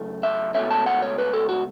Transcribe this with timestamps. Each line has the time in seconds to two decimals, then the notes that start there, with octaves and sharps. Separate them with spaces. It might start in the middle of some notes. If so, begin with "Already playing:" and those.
Already playing: F#2 C#3 A3
0.23 E5
0.54 C#2 B2 A3 C#4 E5
0.71 A5
0.86 F#5
1.02 C#5
1.18 B4
1.33 A4
1.49 F#4